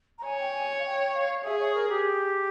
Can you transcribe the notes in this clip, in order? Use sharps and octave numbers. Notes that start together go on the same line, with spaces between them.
A#5
C#5 G#5
G5
G#5
F5
G5
F5
G#4 E5
C#5
A#4
G4